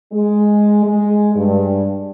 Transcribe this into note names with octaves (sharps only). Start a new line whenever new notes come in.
G#3
G#3
G2